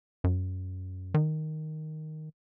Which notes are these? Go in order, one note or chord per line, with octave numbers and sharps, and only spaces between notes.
F#2
D#3